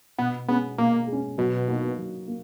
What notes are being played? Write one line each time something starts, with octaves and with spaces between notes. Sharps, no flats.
B2 B3
G#3 B3 C#4
B2 A#3
G#3
C#4
B2 F#3
A#3 D#4 F#4
F#3
A#3